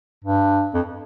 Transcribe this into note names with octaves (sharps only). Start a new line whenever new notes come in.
G2
F2